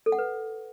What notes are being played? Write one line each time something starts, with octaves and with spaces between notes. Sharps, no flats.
A4
F#5
B4